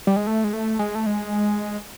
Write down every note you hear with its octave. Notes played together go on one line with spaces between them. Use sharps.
G3
G#3
A3
G#3
A3
G#3
A3
G#3